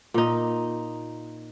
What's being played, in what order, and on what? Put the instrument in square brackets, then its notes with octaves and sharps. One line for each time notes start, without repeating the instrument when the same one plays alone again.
[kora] A#2 D#4